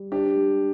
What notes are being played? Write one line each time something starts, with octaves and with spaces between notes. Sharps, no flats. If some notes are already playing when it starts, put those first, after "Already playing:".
Already playing: G3
D4 G4
G3